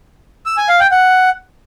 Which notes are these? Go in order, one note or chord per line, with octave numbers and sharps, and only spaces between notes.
E6
G#5
F5
G5
F#5